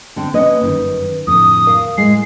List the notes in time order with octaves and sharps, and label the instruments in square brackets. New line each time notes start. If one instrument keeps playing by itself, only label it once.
[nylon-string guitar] D3 C4
[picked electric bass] A#3 C4 C#4 [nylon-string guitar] B4 D#5
[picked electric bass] G1 F#2 D#3
[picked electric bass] F2 A2 D3 [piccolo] D#6
[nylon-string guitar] A#4 F5
[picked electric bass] A2 [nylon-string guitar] G#3 [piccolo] C7